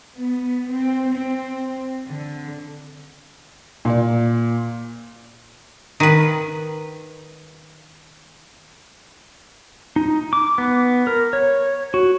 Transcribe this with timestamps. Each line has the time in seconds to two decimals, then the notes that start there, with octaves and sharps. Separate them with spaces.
0.17 B3
0.72 C4
1.13 C4
2.08 D3
3.85 A#2 D5
6.00 D#3 B4
9.96 D#4
10.33 D6
10.58 B3
11.07 A#4
11.33 C#5
11.94 F#4